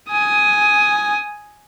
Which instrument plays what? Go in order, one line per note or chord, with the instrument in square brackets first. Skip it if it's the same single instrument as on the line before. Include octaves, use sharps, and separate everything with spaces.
[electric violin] G#5 D#6